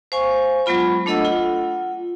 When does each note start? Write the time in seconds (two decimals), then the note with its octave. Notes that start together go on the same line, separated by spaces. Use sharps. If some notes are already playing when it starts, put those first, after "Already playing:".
0.12 C5 F5 G#5 C#6
0.66 F#3 G#3 B3 F4 B5
1.06 A3 D4 A4 D#5 F#5 E6
1.25 F4 F#5